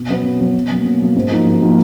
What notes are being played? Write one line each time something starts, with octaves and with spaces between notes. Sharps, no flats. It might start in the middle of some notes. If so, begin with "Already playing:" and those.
Already playing: B2
F#3 B3
B2
F#3 B3
B2
F#3 A#3
B2
F#3 A#3
G#2
F3 A#3 D#4 F#4
G#2
F3 A#3 D#4 F#4